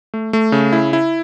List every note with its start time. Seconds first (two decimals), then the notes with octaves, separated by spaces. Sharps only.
0.14 A3
0.33 A3
0.52 C#3
0.73 E4
0.93 E4